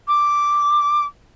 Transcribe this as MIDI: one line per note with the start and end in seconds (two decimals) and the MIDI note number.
0.08 1.04 86